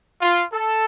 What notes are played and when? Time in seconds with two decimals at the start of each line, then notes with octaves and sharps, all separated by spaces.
0.21 F4
0.53 A4